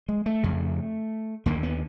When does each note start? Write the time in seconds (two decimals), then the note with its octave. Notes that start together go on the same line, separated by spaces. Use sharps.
0.09 G#3
0.26 A3
0.43 F2 C#3
1.46 D#2 D3 A#3
1.63 B3